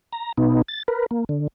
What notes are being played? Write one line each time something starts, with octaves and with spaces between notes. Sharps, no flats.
A#5
B2 B3 D#4
A6
A#4 B4
A#3
D3